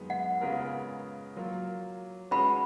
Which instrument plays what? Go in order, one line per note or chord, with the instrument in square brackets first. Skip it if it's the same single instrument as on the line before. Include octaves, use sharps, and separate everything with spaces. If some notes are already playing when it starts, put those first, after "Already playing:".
Already playing: [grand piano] F#2 D#3 G#3 B3
[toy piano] F#5
[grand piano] C#3 G#3 B3 F4 A#4
F#3 A#3 F4
[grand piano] G#3 C#4 F#4 B4 [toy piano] B5